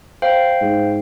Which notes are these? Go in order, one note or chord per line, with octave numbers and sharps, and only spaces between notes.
C5 F5 G5
G#2